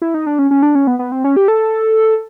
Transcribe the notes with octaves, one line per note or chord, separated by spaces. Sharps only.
E4
D#4
D4
C#4
C#4
D4
C#4
B3
B3
C4
C#4
G4
A4